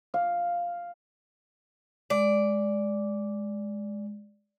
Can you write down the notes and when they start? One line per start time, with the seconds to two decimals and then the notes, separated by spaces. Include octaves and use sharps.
0.14 F5
2.10 G#3 D5